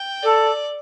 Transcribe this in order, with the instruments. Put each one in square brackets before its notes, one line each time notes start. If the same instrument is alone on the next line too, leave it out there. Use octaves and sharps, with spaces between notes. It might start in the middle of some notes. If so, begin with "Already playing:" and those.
Already playing: [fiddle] G5
[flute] A4 [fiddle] D5